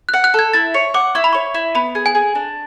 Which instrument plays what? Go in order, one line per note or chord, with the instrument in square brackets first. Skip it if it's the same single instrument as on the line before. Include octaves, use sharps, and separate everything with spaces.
[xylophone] F#6
[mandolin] F#5
[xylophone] F#6
[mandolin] A4 [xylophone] G#6
[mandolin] E4 [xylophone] A6
[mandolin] C#5
[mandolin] F#5 [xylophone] D6
[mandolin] E4 [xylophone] C#6
[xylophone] B5
[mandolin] C#5 [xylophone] C#6
[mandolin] E4
[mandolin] B3 [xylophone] B5
[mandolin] G#4
[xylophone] G#5
[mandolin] G#4
D4